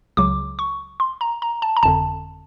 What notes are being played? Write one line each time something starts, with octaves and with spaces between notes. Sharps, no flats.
C#2 C#3 F#3 D6
C#6
C6
A#5
A#5
A5
A#5
G1 F2 D3 A5